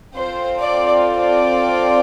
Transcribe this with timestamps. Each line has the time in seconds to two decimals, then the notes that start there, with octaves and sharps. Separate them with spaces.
0.15 C4 F4 A4 C5
0.60 D5
1.04 D5